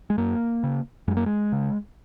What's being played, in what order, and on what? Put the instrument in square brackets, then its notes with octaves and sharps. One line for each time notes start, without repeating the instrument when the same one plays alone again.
[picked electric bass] G#3
F#2 A#3
C#3
F#2 G#3
A#3
G#3
C#3